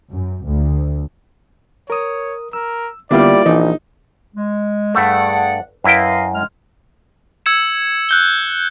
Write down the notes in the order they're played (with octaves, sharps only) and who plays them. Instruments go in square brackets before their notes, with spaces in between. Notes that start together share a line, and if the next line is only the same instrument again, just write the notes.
[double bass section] F#2
D2
[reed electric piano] A#4 D#6 [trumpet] C#5
[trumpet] A#4 [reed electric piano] E6
[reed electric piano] D3 B3 [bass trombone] G3 [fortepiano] A#3 E4 F4 [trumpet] D5
[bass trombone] A#1 [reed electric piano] E3 [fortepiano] D#4
[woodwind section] G#3
[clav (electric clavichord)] G2 A3 [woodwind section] G#4 D5 F#5
[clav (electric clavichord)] F#2 E4 G5 [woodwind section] B4 D#5 F5
[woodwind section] G#3 F6
[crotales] E6 G#6 C#7 E7
F#6 G6 G7